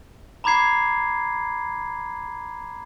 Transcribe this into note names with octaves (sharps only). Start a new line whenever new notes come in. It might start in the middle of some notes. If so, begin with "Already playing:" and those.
A#5 B5 D6 G#6 C7